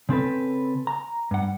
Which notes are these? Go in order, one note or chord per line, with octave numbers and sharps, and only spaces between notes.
C#3 C4 A4 B4
A#5
G2 F#5